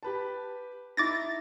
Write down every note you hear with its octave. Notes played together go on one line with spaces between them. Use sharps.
G4 B4 A5
D#4 E4 D6 A6 A#6